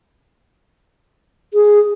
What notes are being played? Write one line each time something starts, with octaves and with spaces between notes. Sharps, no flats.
G#4